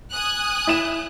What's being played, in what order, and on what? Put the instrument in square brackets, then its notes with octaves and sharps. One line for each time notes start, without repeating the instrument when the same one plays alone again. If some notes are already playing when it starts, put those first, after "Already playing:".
[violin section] G#5 D#6 F#6
[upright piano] E4 E5 E7